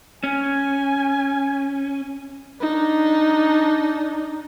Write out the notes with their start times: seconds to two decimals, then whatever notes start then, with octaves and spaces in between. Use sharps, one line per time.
0.24 C#4 G#5
2.61 D4 D#4